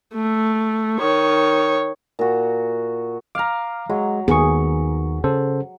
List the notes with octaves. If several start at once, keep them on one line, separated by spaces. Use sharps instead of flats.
A3
D#3 C#5
A#2 F#4
F5 A#5 D6 F6
F#3 G#3
D#2 D#3 B3 G#4 C#6
C#3 A4 C5